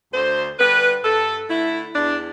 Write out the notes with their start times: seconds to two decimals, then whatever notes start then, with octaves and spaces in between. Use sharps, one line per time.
0.13 D2 C5
0.59 D3 G3 B4
1.04 G2 A4
1.50 D3 A3 E4
1.95 E2 D4